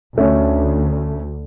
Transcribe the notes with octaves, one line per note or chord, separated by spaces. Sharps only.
D2 A3 C#4